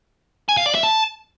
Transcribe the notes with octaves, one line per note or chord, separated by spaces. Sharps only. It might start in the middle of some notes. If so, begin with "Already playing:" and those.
G#5
F5
D5
E5
A5